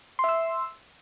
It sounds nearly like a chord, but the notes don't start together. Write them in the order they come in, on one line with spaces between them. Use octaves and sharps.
C6 E5 E6